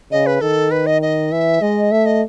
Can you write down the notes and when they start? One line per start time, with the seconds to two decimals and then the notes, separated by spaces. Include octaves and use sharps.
0.12 C#3 D#5
0.26 B4
0.41 D#3 A4
0.71 B4
0.86 D#5
1.02 D#5
1.32 E3 E5
1.61 G#3 D#5
1.92 A3 E5
2.06 D#5